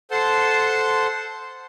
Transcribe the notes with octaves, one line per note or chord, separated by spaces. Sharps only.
A4 C5 F#5 A5 C6